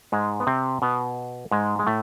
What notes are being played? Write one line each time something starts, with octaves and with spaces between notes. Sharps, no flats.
G#2 G#3
B3
C3 C4
B2 B3
G#2 G#3
G#3
A2 A3